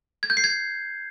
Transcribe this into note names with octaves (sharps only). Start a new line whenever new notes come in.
G#6
G6
C7
G#6